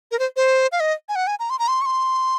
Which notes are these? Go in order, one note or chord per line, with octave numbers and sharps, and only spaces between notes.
A#4
C5
C5
F5
D#5
G#5
F#5
G#5
A#5
C6
A#5
C6
C#6
C6